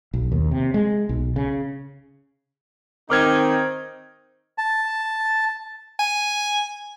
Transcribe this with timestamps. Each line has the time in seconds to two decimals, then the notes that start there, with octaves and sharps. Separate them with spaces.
0.14 B1
0.32 D#2
0.51 C3
0.74 G#3
1.09 B1
1.36 C#3
3.10 D#3 C4 D#4 D6 F6 G#6
4.58 A5
5.99 G#5